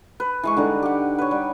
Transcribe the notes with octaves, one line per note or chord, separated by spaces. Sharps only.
B4
E3 G#3 C#6
D3 G3 D#4
G4 F#5
B4 C#5
G3